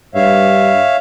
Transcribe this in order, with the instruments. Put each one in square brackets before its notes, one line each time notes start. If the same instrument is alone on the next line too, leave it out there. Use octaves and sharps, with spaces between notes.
[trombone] G2 [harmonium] C#5 E5 F5